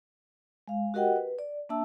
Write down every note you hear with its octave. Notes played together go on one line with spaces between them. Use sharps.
G#3 F5
F#4 G4 A#4 D#5 F#5 G5
B4
D5
A#3 D4 E5 A5 E6